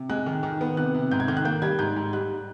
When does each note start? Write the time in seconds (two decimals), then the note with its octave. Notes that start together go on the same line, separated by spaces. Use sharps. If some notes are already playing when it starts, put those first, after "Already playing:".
Already playing: C3
0.09 G#3 F#6
0.26 D#3
0.43 D#3
0.61 B3
0.77 C3 F#6
0.94 C3
1.11 G#2 G6
1.20 G#6
1.28 D#3 G6
1.37 F#6
1.45 A#3 G6
1.62 G3 G#6
1.79 G#2 G6
1.96 G#2
2.13 G3 F#6